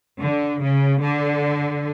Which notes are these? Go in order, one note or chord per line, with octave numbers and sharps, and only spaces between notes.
D3
C#3
D3